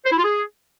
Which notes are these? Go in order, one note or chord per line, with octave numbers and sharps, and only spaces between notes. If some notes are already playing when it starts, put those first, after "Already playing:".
C5
E4
F4
G#4